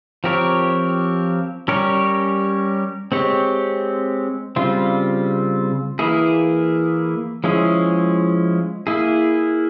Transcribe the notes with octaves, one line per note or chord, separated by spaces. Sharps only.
F3 C4 G4 A#4 C#5
G3 C#4 G4 A#4 C#5
G#3 C4 G4 C#5
C#3 G3 C4 F4
E3 A#3 E4 G#4
F3 G#3 C#4 E4 G#4
A#3 E4 G#4